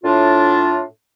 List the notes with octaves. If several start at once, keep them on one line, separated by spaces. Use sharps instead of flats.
A2 D4 F4